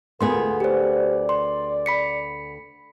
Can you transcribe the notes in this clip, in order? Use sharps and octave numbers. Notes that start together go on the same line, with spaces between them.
D2 A#3 B3 F4 G#4 A#4 C6
G4 C5 D5
C6
B5 B6 C#7